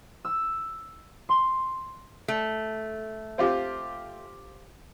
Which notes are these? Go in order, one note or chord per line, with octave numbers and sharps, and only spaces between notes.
E6
C6
A3
C4 F4 G4